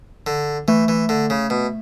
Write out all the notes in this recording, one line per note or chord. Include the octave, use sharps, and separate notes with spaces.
D3
E3 A3
E3
D3
C#3
B2